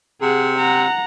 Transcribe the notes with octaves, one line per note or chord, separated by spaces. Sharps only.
C3 G#4 F#5
F#5 A#5